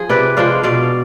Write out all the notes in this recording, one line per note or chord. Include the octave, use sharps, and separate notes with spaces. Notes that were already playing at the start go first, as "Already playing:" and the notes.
Already playing: F3 G#4
C3 B4 D5
F3 G#3 D4 D5 F5
B2 D5 F5